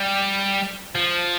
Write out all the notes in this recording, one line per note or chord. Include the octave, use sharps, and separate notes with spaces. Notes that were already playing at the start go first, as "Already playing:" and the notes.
Already playing: G3
F3